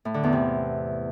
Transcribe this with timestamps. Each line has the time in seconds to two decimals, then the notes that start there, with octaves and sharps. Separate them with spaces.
0.05 A2
0.14 D3
0.23 E2
0.33 C3